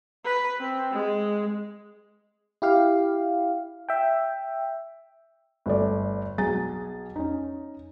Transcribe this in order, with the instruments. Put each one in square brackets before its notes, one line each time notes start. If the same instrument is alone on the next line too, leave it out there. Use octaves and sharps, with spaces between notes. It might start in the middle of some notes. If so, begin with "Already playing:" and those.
[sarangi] B4
C4
G#3
[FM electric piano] E4 G4 F5
E5 G5
[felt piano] G1 A3 D5
B1 G#4 G#5 A#5 A6
C#4 D#4